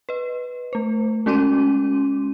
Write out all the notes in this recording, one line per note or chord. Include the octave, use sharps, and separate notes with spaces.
B4 D#5
A3 C5
G#3 C#4 F#4 C6 D6 D#7